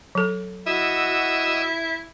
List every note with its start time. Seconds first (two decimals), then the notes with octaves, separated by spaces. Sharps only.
0.15 F#3 A4
0.66 E4 F#4 D#5 E6